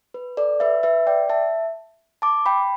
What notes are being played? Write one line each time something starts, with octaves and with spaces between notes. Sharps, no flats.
B4
A4 D5
B4 E5
B4 E5
D5 G5
E5 A5
A5 D6
G5 B5